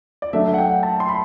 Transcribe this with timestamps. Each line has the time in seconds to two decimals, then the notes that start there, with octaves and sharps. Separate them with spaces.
0.22 D5
0.33 F#3 A3 D4 E5
0.54 F#5
0.58 G5
0.83 A5
1.00 C6
1.09 B5